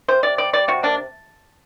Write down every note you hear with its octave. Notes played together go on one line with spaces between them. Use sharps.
C3 C5
C3 D5
G3 D5
G3 D5
C3 F#4
A#3 D4